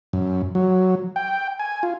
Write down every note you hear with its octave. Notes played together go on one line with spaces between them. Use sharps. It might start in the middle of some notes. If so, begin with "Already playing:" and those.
F#2
F#3
G5
G#5
F4